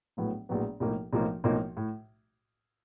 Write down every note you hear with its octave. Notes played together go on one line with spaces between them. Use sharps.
A#1 A2 F#3 B3
A#1 A2 F#3 B3
B1 A2 F3 A#3 D#4
B1 A2 F3 A#3 D#4
B1 A2 F3 A#3 D#4
A2